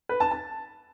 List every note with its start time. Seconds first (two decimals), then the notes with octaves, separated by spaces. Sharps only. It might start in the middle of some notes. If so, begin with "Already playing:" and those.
0.09 B4
0.20 A5
0.31 A5